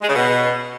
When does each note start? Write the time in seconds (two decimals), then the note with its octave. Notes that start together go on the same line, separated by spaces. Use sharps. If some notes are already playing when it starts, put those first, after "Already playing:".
0.01 G#3
0.08 C#3
0.15 B2